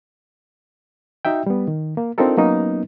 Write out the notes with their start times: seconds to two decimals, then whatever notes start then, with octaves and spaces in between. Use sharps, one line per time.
1.25 D#4 F#4 E5 G5
1.46 G3 B3
1.68 D#3
1.97 A#3
2.18 C4 D4 D#4 F4 A4 A#4
2.37 F#3 A#3 B3 C#4 D#4